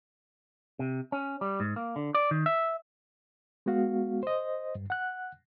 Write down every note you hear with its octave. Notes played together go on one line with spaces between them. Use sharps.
C3
C#4
G3
G#2
A#3
D3
D5
D#3
E5
G#3 B3 F#4 F5
C5 D#5
G2
F#5 F#6